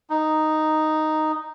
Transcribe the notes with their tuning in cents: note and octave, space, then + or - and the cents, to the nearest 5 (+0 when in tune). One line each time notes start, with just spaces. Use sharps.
D#4 -5